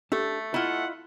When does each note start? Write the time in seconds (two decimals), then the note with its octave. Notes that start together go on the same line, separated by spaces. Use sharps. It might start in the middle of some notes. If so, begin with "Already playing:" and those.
0.12 A3 D4 G4 A4
0.54 E4 F4 D#5 F#5